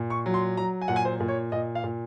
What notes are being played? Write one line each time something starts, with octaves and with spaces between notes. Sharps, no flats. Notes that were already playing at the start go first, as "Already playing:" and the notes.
Already playing: A#2
C#6
F#3
C6
F#3 A#5
G#5
A#2 F#5
G#5
C5
A#2
C#5
A#2 D#5
F5
A#2